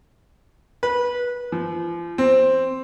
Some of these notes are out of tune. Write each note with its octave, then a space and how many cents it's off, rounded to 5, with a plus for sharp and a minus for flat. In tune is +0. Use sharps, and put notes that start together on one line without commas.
B4 -20
F3 -35
C4 +5